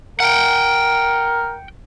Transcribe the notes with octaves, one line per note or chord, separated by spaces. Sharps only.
A#4 F#5 G5